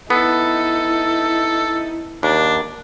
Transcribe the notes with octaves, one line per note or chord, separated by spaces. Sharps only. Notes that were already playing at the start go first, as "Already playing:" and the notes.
B3 D#4 E4 A4
D#2 D4